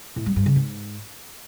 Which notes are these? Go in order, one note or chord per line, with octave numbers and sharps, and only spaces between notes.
A2
G3
G2
C#3
G#2